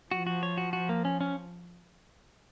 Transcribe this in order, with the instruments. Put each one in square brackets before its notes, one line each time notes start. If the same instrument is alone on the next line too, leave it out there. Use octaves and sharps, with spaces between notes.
[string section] F3 [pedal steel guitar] F#4
[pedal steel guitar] F#4
C#5
F#4
F#4
A#3
C#4
C#4